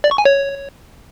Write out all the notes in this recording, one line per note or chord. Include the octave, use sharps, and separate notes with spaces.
D5
C#6
G#5
C#5